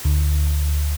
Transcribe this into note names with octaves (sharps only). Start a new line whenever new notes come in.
D2